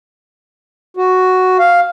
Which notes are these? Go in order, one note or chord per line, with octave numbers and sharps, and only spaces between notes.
F#4
F5